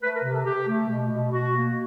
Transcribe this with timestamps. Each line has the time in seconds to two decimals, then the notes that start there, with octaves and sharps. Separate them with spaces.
0.02 A3 B4
0.16 A#4
0.24 C3
0.31 A4
0.45 C3 G4
0.67 A3
0.89 B2
1.11 B2
1.31 B2 F#4
1.54 A#3